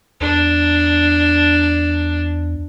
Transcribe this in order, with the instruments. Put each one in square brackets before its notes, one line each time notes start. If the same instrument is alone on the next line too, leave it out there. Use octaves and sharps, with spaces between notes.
[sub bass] E2 [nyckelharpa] D4